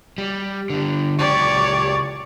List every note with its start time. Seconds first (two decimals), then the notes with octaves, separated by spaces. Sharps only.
0.18 G3
0.70 D3 G3
1.19 C#2 G4 C#5 D5